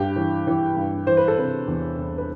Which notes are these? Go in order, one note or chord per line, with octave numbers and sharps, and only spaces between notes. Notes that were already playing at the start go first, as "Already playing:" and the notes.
Already playing: G2 G4
E3
E3
G2
E3 C5
B4
A4
C3 B4
E2
E2
B4